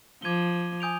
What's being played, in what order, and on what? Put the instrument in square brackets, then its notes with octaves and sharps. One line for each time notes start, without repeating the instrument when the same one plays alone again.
[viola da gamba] F3 [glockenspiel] D6 G#6 D#7 G7
[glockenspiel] G#5 D#6 G6 D7 F7